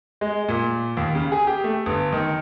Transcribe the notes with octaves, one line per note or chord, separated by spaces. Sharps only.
G#3
A#2
D#2
C#3
G#4
G4
A3
G1
D#3